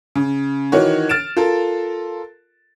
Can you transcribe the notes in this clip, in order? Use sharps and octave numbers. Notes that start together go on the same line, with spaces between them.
C#3
D#3 E3 F#4 C#5
F6 A6 D7 E7
F4 A4 A#4